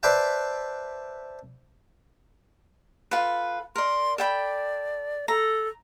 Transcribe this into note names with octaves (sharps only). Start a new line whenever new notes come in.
B4 C5 D5 E5 G5 A5
F4 A4 B4
A#4 D5 C6
A4 D5 G5 B5
A4 A#5